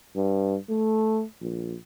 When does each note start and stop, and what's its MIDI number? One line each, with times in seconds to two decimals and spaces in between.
0.16 0.57 43
0.70 1.24 57
1.41 1.76 34